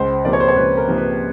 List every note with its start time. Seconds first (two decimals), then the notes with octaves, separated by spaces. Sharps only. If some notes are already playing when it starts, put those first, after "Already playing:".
Already playing: C#2 C5
0.25 C3 F3 A#3 D5
0.33 C#5
0.40 C5
0.48 C#5
0.56 C#2 B4
0.77 A#4
0.88 C3 F3 A#3
0.98 B4